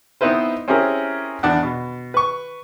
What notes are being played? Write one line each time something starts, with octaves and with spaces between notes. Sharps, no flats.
B3 C4 D#4 E4 B4 C5
C4 C#4 E4 G4 G#4 A#4
E2 D4 F#5
B2
B4 C#6